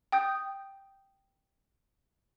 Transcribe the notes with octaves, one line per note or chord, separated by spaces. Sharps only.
G5 D#6 G6